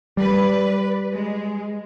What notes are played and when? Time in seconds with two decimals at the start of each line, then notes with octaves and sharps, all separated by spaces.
0.17 G3 B4 D5
1.15 G#3